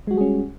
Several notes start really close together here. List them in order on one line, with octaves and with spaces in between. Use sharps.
G#3 F#4 G3 G#4 C#4